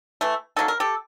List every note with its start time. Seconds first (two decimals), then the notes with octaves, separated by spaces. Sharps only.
0.21 E3 A3
0.56 D#3 F#3 A#3 A4
0.68 A#4
0.80 G4 A4